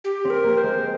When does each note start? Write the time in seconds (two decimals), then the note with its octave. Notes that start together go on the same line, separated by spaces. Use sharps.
0.04 G4
0.24 C4
0.30 A#4
0.44 A#3
0.58 C5
0.63 G#3